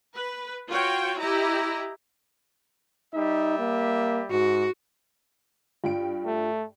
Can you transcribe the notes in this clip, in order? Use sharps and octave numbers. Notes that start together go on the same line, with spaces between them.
B4
F4 F#4 C#5 G5
E4 G4 D#5 A#5
G3 D#4 E5
A#3
G#2 F#4
G2 F4 G5 D7
A3